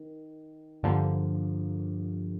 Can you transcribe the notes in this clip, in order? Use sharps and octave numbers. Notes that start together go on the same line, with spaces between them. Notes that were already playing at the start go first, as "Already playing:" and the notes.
Already playing: D#3
G2 D3 F3 A#3